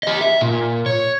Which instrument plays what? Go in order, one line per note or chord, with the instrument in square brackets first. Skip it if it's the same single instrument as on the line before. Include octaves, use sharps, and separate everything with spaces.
[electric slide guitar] G4 D#5
E5
A#2
C#5